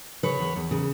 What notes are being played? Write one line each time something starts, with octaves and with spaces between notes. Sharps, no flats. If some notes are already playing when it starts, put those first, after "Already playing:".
C#3 B4 C#5
E2
E2
C#3